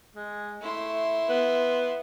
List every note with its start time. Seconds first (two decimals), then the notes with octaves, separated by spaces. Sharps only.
0.16 G#3
0.61 A3 E4 C6
1.29 B3